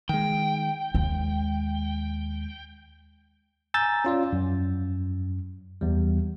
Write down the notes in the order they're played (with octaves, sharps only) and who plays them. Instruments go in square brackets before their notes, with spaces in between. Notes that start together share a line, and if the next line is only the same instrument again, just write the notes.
[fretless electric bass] D#3 G#3 [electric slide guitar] G5
[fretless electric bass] D#2 [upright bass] G#3
[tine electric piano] G#5 A#5 E6 G6 A6
C#4 F4 D5
F#2
E2 G3